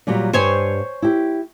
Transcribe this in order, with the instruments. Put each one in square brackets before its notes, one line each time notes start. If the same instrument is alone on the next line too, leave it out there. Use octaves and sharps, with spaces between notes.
[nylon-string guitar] A#2 F#3 G3
[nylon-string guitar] G2 G3 [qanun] C5 C#5 G#5
[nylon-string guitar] E4 G4